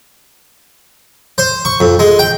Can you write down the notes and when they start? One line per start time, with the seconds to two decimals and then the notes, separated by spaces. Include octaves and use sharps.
1.38 C5
1.65 C#6
1.80 F2
1.99 G#3
2.19 G5